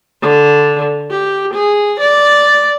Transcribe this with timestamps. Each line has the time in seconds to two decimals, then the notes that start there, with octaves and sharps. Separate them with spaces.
0.23 D3
1.10 G4
1.54 G#4
2.01 D5